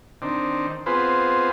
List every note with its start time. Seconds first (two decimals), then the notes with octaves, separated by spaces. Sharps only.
0.22 D#3 C4 D4
0.86 B3 C4 F4 G#4 B4 C5